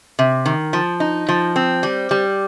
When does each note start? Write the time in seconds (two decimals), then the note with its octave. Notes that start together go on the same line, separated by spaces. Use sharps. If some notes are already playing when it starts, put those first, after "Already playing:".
0.19 C3
0.46 D#3
0.73 F3
1.00 D#4
1.29 F3
1.56 C4
1.83 G3
2.11 G3